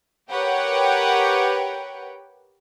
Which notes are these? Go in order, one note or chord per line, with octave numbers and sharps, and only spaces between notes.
G4 A#4 B4 C#5 F#5 G5